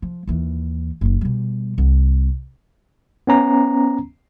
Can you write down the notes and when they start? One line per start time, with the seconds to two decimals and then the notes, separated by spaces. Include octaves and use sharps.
0.02 F3
0.27 D#2 E3
1.01 F#1 D#3
1.21 B2 G3
1.78 C2
3.27 B3 C#4 A#5